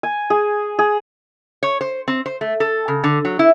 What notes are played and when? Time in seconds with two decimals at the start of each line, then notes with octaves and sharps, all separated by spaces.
0.03 G#5
0.30 G#4
0.79 G#4
1.63 C#5
1.81 C5
2.08 C4
2.26 C5
2.41 A3
2.60 A4
2.88 C#3
3.04 D3
3.25 F#3
3.39 E4